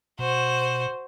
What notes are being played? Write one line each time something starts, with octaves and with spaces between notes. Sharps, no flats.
B2 F#4 C5